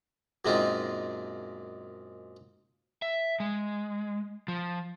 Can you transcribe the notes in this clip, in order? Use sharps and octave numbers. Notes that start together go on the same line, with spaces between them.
F#2 A#2 G#3 C4 D#4 F4
E5
G#3
F3